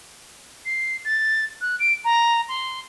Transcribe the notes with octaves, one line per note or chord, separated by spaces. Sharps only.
C7
A6
F#6
D7
A#5
C6